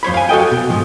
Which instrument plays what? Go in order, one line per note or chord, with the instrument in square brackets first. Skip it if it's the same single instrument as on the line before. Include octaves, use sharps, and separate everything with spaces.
[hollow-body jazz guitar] F2 C5 C#5 B5
F5 G#5
F#4 A4 D#5 G5
B2
G#2 B2 F3